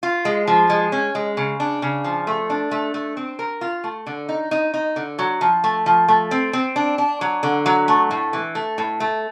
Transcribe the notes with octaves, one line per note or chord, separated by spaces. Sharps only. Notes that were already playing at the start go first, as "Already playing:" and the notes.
F4
G#3
F3
G#3
C#4
G#3
C#3
D4
C#3
F3
A3
D4
A3
A3
C4
A#4
F4
A3
D3
D#4
D#4
D#4
D3
F#3
F3
A3
F3
A3
C4
C4
D4
D4
F#3
D3
F#3
A3
A2
E3
A3
A2
A3